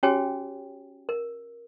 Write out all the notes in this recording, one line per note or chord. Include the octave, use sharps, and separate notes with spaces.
C#4 F#4 G4 C#5 G5 G#5
A#4